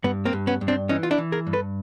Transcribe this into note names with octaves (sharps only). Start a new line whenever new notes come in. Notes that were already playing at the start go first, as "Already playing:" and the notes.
G2 B3
A#3 C4
G2
B3 C#4
G2
C4 D4
E3 C#4 D#4
F4
D4 E4
E3
G#4 A#4
G2
A4 B4